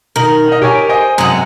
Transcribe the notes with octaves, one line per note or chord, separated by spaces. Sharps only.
B2 D#3 D#4 A#4 F#7
D#4 D#5
G4 C#5 G#5 D7
C5 D#5 G#5
F#2 C3 G#3 F#4 D#6